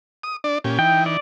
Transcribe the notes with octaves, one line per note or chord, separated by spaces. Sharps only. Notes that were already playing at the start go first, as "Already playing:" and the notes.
D#6
D4 D5
A#2 C#4 G4
E3 D#4 G5
D5